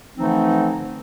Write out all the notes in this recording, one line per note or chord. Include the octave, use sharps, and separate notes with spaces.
D3 E3 F3 A3 C4 D#4